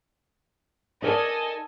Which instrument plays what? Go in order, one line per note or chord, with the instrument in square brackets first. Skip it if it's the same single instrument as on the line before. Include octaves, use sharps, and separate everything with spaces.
[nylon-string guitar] D#4 A#4 D5 [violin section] A4 D#5 G#5